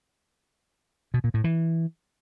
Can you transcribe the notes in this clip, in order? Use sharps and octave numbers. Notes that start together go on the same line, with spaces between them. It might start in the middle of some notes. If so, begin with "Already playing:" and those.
B2
A#2
A2
E3